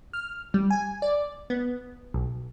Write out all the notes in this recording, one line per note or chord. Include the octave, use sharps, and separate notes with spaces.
F6
G3
G#5
D5
B3
B1